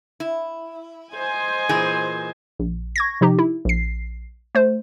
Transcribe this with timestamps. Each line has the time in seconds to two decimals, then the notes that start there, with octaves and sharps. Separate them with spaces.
0.20 E4
1.13 C5 D#5 G#5
1.69 A#2 E3 G#4
2.59 A#1
2.96 C#6 G#6 A#6
3.21 C3 F3 D#4 G4
3.39 E4
3.65 A#1 C7
4.55 A3 C5